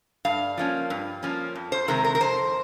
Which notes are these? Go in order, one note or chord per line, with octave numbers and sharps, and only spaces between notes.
G2 F5
F3 A#3 C#4
G2
F3 A#3 C#4
F2
C5
C3 D#3 G#3 C4 A#4
A#4
A#4
F2 C5